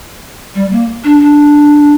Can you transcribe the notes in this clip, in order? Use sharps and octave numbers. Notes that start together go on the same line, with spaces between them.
G3
A#3
D4
D4